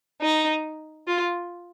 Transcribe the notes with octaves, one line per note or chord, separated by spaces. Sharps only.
D#4
F4